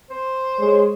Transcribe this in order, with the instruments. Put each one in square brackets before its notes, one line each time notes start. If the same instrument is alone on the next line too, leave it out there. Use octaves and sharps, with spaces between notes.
[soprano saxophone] C5
[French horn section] G#3 C#5